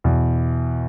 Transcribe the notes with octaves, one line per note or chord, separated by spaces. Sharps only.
E2 B2